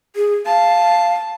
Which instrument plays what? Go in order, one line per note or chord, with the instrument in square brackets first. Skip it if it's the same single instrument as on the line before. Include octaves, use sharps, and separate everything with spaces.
[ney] G#4
[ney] F5 [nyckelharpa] A5